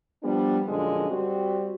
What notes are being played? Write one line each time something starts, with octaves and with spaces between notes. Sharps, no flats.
F3 G3 B3 D4
F#2 A#2 D3 F3 G#3
G3 C4 F#4